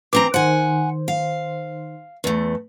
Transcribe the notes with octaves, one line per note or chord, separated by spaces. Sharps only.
E3 C4 A#5 D6
D#3 C5 F#5 G#5
F5
E2 A3